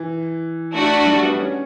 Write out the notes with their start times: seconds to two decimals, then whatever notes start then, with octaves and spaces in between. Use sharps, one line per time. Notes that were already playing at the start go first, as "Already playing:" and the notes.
Already playing: E3
0.74 A3 D4 F#4
1.06 G3
1.23 B3
1.39 C#4